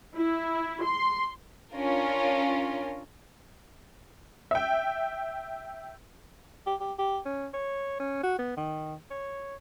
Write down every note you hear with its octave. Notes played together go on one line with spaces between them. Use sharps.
E4
C6
C#4 D4 F4 A#4
E5 G5
G4
G4
G4
C#4
C#5
C#4
F#4
B3
D#3
C#5